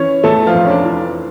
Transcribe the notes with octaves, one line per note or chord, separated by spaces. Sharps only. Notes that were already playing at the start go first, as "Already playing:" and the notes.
Already playing: E3 C#4 C#5
E2 A3 A4
F3 F4
F1
C#4
D4
E3